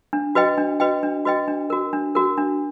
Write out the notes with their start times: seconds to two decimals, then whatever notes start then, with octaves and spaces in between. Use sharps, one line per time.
0.13 D4
0.35 F#4 B4 D#5 G5
0.58 D4
0.80 F#4 B4 D#5 G5
1.03 D4
1.25 F#4 B4 D#5 G5
1.48 D4
1.70 F#4 A#4
1.93 D4
2.15 F#4 A#4
2.37 D4